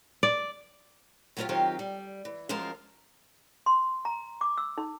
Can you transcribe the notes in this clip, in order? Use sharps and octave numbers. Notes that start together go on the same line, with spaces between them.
D5
F#3 A3 B3 D4 F4 G4
D#3 F#3 C4 D#4 F4 G4
G3
E3
F#2 F3 G#3 F4 A#4 A5
C6
A#5
D6
E6
D#4